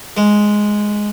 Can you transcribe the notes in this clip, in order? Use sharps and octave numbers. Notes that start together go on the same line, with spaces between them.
G#3